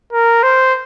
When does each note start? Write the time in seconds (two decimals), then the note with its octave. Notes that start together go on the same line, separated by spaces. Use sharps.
0.13 A#4
0.43 C5